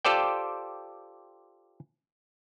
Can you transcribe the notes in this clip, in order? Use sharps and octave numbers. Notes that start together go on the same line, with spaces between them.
F4 G4 A4 C5 D5 G5